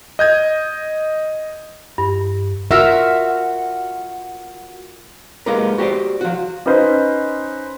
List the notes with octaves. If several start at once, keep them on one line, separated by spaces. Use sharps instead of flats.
D#5 G6 G#6
G2
F4 F#4 A#4 E5
G#3 A#3 B3 D#4 G4 A#4
F#4 G4 C5 D5
F3 F#4
C#4 D#4 B4 C5